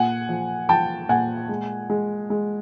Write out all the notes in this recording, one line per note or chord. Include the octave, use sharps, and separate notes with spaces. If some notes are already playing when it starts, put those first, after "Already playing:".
Already playing: A#2 F#5 G#5
F3
F3 G5 A5
A#2 F#5 G#5
G#3
G#3
G#3